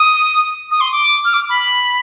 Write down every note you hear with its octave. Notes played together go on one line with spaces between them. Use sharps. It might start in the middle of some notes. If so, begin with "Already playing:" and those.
Already playing: D#6
D#6
C6
D6
F6
D6
B5